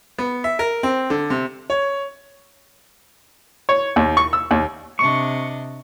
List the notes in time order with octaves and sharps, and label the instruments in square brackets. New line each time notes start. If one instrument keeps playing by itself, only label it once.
[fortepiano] B3
E5
A#4
C4
D3
C3
[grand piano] C#5
[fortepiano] C#5
D#2
C#6
E6
D#2
[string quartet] C3 D4 D#5 [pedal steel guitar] C#6